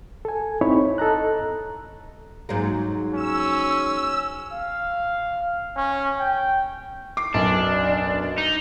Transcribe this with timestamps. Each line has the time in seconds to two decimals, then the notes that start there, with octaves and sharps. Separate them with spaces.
0.25 A4 G#5
0.61 C4 D#4 E4 C#5 B5
0.98 A4 D#5 A#5 F#6
2.49 G#2 F#3 A#3
3.14 C#4 E6
4.52 F5
5.76 C#4
6.19 G5
7.17 D6 C7
7.34 B1 F#2 D4
8.38 D#4